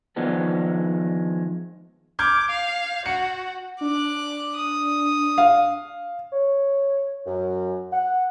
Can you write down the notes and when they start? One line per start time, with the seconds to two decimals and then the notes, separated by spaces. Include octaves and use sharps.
0.16 D#3 F3 G#3 B3 D4
2.19 D6 F6 G6 G#6
2.51 F5
3.06 F#4 C#7
3.81 D4 D6 F#6
4.56 D#6
5.38 F5
6.33 C#5
7.26 F#2
7.93 F#5